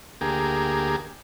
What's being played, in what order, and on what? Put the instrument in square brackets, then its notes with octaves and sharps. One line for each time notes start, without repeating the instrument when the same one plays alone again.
[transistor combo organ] D2 A#3 G4 G#4